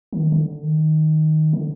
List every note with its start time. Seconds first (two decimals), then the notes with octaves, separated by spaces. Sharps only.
0.13 D#3
0.32 D3
0.63 D#3
1.53 D3